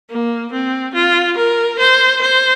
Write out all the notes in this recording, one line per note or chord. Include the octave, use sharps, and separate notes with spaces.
A#3
C4
F4
A#4
C5
C5